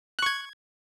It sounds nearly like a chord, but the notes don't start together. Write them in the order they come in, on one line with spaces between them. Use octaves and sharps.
F#6 C#6 G#6